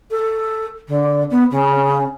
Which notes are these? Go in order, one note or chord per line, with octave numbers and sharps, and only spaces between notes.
A4
D3
B3
C#3